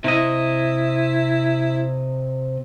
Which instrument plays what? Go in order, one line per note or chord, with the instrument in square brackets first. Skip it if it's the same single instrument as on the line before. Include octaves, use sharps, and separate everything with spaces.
[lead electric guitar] C3 D#5 [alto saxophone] E4